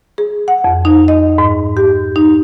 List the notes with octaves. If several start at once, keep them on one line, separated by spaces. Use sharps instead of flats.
G#4
F#5
F2
D#4
D#5
G#2
G4
D#4